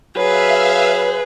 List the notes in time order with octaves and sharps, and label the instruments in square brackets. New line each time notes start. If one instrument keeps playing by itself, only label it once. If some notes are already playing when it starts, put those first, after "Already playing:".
[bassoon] F#3 [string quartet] G#4 [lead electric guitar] B4 [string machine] E5 F5